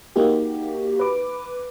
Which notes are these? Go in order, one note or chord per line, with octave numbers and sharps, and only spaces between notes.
A#3 D#4 F#4 G4
B4 D6